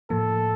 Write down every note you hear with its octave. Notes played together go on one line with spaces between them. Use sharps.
A2 F3 A#3 A4